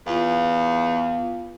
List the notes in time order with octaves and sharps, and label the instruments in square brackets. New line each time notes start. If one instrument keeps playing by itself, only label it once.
[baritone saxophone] E2 [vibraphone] B3 F4 F5